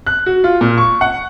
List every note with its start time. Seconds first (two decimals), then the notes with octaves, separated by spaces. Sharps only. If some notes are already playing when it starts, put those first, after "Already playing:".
0.07 F#6
0.26 F#4
0.44 F4
0.61 A#2
0.78 C#6
1.01 F#5